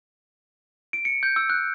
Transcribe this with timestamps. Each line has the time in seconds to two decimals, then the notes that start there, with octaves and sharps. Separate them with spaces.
0.93 D7
1.05 C#7
1.23 G6
1.36 E6
1.50 F#6